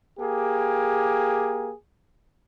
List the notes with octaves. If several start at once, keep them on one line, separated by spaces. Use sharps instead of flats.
A#3 G4 G#4